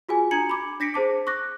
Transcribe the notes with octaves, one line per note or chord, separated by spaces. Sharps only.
F4 F#4 G#4 G#5
D4 A#5 G#6 C#7 F#7
B5 D6
D4 A#6 B6 C#7 D7
G#4 C5 A5 D6
C#6 D6 F#6 A#6